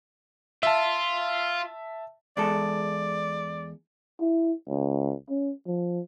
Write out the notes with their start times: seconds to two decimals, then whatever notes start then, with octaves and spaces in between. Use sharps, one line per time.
0.63 F4 E5 A5
2.37 E2 G#3 A4 D5
4.21 E4
4.69 C#2
5.29 C#4
5.67 F3